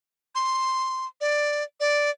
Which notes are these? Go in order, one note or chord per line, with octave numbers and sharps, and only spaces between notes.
C6
D5
D5